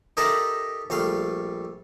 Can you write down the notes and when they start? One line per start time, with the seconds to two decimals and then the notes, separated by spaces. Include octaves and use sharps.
0.17 D#4 G4 A4 A#4 E5 G5
0.90 A#1 G3 A3 F5